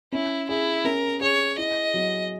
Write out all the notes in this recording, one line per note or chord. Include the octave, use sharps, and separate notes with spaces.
C#4 E4
E4 G#4
C#4 A#4
G#4 C#5
E4 D#5
F#3